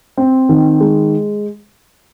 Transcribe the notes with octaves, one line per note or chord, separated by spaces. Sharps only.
C4
D#3
G#3